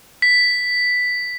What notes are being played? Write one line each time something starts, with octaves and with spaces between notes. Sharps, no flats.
B6